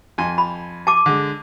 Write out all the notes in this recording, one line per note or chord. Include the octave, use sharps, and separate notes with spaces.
F2 G#5 C6
B5
A5 D6
D3 G#3